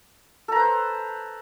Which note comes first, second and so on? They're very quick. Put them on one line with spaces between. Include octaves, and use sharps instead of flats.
A4 A#5 B4 C5